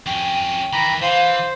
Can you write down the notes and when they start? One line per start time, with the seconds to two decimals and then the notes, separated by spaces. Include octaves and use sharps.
0.06 F2 C#4 G5
0.73 D#3 E3 A#5 B5
1.02 E3 C5 F5